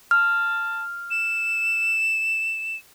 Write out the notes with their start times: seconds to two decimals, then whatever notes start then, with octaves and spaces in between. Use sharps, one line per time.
0.11 A5 F6
1.11 E7